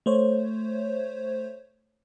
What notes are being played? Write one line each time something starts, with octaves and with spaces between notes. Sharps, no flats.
A3 C5 C#5